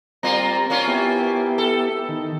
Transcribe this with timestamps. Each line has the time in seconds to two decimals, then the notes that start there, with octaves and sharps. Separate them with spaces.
0.23 G3 A#3 C4 F4 A#5
0.70 A#3 C#4 F4
0.88 B3 E4 G4
1.58 A4
2.09 D#3